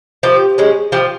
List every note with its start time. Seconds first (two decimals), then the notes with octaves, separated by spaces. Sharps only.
0.23 F3 G4
0.58 G#3 C#4
0.92 F3 G4